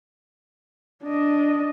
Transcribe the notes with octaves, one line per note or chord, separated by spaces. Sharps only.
D4 D#5